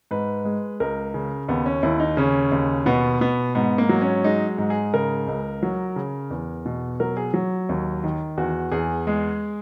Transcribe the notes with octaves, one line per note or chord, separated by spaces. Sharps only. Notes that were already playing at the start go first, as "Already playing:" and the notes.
G#2 B4
G#3
C#2 A#4
C#3
D#2 B3
C#4
D#2 E4
D#4
C#3 C#4
D#2
B2 B3
B2 B3
G#2 B3
A#3
F#3
C#4
G#3 D#4
G#2
G#4
C#3 A#4
C#2
F#3
C#3
E2
B2
F#3 A#4
G#4
F#3
D#2
D#3
E2 F#4
E2 G#4
G#3